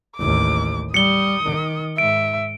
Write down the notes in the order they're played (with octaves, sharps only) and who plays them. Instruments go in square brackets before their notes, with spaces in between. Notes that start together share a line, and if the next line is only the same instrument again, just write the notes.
[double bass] A1 D#2 [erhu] D6
[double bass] G3 [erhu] D#6 [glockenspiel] C#7 G7
[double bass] D#3
[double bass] G#2 [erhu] E5 [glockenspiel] D7